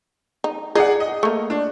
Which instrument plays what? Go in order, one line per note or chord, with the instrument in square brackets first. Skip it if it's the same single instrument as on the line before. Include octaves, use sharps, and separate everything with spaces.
[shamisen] D#4
[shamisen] D#4 [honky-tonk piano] G#4 D5 F#5
[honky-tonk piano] D#5
[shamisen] A3 A#3
[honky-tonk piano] D4